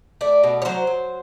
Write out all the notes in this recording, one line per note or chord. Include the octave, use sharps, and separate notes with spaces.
A3 D5
B2
C#5
F#3 C5
F#3